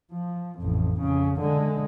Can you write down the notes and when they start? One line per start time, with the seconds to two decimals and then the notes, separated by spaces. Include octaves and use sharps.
0.12 F3
0.59 A1 F2
1.01 F2 C#3
1.41 D3 G#3